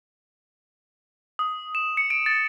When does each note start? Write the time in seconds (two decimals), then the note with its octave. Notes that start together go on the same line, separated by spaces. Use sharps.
1.39 D#6
1.75 E7
1.97 C#7
2.10 D7
2.26 A6